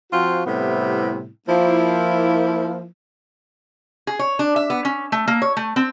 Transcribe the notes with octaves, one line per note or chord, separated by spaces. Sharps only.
F3 C4 F4 F#4
A2 C3 G3 B3 C4 E4
F3 A#3 E4
G#4
C#5
D4
E5
B3
C#4
A3
A#3
C#5
A3
C4